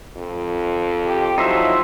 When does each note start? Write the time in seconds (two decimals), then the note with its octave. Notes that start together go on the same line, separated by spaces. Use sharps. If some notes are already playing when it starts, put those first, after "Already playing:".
0.17 F2
1.07 G4
1.38 F3 F#3 D#4 E4 C5 E5